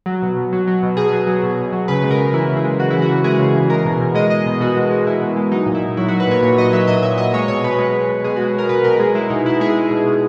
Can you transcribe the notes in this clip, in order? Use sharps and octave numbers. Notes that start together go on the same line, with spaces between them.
F#3
B2
B2
F#3
F#3
B2
B2 G#4
F#3
F#3
B2
B2
F#3
C#3 B4
G#3
A#4
C#3
E3 E4
C#3
G#4
G#3
C#3 F#4
E3 E4
F#4
C#3
G#3 G#4
C#3
E3
G#3 A#4
B2
B2
G#3 D#5
G#3 D#5
B2
B2 F#4
G#3
G#3
B2 E4
B2
G#3
F#3 D#4
A#2
E4
A#2
F#3 E4
F#3 F#4
B4
A#2 C#5
A#2 C#5
F#3 D#5
F#3 E5
A#2 D#5
A#2 E5
F#3 D#5
G#3 C#5
B2 C#5
B2 B4
G#3
G#3
B2
B2 G#4
G#3 F#4
G#3 A#4
B2 B4
B2 A#4
G#3 G#4
G#3 E4
B2 D#4
B2 E4
G#3 G#4
G#3
B2
B2